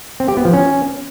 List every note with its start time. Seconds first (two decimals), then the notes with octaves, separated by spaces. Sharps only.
0.20 C4
0.28 G4
0.37 B3
0.45 F3
0.53 C#4